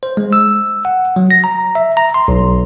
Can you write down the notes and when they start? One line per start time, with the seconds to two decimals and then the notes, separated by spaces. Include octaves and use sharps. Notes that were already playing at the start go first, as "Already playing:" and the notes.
0.03 C5
0.17 G#3
0.33 E6
0.85 F#5
1.16 F#3
1.31 A#6
1.44 A#5
1.75 E5
1.97 A#5
2.14 C6
2.28 B1